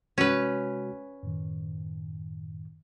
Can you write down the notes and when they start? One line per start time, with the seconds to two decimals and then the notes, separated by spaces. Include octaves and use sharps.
0.18 C3 G#3 C#4 F#4 B4
1.23 F#2 A2 D#3